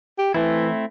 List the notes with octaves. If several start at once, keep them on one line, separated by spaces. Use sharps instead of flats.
G4
E3 A3 C4 E4